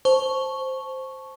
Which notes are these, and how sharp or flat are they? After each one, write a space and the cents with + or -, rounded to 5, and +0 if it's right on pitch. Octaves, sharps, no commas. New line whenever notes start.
C5 +0 A5 -10 C#6 +0